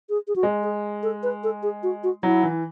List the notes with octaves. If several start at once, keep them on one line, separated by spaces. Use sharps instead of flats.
G#4
G#4
F#4
G#3
G#4
A4
B4
A4
G#4
F#4
F#4
F#3 E4
E3